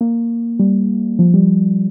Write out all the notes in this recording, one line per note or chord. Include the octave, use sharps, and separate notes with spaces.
A#3
G3
F3
G3